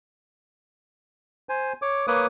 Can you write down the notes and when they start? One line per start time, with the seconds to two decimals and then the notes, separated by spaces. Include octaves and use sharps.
1.49 C5 G#5
1.82 C#5 D6
2.08 A#3 B4 C#5 D6 D#6